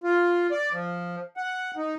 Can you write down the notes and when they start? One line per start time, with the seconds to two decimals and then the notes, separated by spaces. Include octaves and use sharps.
0.04 F4
0.51 D5
0.73 F3
1.37 F#5
1.77 D#4